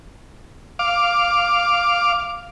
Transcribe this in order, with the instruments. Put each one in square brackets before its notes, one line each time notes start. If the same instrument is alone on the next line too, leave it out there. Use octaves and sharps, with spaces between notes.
[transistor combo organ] F5 D6